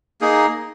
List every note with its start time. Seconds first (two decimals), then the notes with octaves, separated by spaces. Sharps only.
0.21 A#3 D#4 G#4